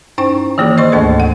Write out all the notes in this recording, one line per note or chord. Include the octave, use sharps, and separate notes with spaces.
G2 C#4 D#4 C5 G5 C#6
D#3 E3 A#3 F4 G#4
C5 D#5 C6 C#6
D2 G#2 A3 D4 A4 B4
F#5